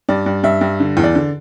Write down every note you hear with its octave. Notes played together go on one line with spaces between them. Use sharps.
G2 D5
G2
G2 E5
G2
D3
E2
D5
D3